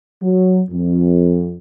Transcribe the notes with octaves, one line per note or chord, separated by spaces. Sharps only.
F#3
F2